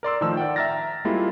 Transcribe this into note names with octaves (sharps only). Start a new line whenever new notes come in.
A#4 D5 C6 E6
A2 D#3 F3 A5 E6
D5 F#5 G5
E5 G5 A#5 F6 A6 A#6
G3 G#3 A#3 C4 E4 F4